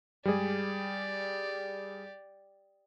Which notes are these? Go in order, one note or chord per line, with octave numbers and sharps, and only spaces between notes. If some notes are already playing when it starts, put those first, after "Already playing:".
G2 G3 G#3 G4 G#4 D5